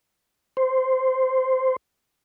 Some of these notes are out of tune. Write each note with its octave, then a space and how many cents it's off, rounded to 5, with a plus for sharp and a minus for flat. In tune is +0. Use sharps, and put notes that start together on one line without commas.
C5 -10